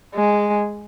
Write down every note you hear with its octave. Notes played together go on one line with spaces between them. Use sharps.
G#3